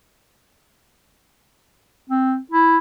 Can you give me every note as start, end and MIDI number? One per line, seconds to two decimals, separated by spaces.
2.10 2.37 60
2.51 2.77 64